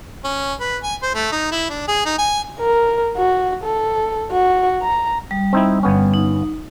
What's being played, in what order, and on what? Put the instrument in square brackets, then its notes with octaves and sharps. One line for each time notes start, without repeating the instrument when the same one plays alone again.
[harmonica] C#4
B4
G#5
C5
A3
D#4
E4
D4
G#4
D#4
G#5
[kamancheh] A#4
F#4
A4
F#4
A#5
[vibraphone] G3
[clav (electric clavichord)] C4 D#4 E4
G1 B3 C#4
[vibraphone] D#4